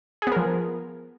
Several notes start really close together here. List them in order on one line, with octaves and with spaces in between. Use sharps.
G#4 B3 A#4 F3